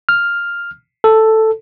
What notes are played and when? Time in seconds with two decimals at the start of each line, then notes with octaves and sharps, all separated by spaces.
0.09 F6
1.04 A4